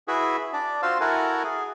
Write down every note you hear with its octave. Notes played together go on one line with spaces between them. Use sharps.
E4 F#4 G#4 B4 E5
D4 D5
F4 F#4 C5 F5 E6
E4 F#4 A4 A#4 F#5 G#5
G#4